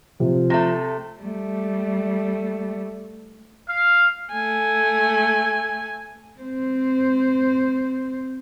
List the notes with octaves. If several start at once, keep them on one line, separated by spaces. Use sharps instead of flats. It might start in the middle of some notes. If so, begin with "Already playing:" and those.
C3 F3
C3 A3 A#6
G3 A3
F5
A3 G#5
C4 C5